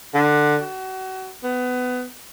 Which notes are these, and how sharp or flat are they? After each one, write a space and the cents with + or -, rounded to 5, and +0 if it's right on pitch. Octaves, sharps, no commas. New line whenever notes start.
D3 +15
F#4 +30
B3 +20